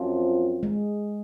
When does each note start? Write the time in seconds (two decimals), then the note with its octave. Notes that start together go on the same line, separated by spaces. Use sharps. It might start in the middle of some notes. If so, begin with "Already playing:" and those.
Already playing: F#2 F3 C4 F4
0.63 G#3